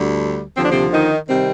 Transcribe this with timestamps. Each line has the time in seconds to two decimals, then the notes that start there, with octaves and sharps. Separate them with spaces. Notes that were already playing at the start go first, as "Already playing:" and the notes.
Already playing: D2 D3 G3
0.56 D#2 D3 F3 C4
0.65 D4
0.71 C3 C4
0.92 D#3 D#4
1.28 C3 D#3 G3 C4